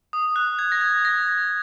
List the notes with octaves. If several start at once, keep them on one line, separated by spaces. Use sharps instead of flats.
D#6
F#6
G#6
A#6
G#6
A#6